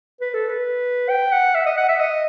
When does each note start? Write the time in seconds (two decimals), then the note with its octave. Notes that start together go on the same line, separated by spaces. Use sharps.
0.21 B4
0.34 A4
0.49 B4
1.09 G5
1.32 F#5
1.55 E5
1.66 D#5
1.77 F#5
1.88 E5
2.00 D#5